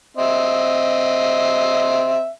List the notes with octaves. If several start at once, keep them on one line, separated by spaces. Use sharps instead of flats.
C4 D#5 E5